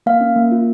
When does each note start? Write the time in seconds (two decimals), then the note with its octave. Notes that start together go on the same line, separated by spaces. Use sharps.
0.06 A#3 F5
0.21 C#4
0.36 A#3
0.52 F4